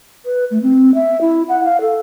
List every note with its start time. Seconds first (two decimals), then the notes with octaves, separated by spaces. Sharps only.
0.25 B4
0.50 A3
0.62 C4
0.94 E5
1.21 E4
1.48 F#5
1.64 F5
1.81 A4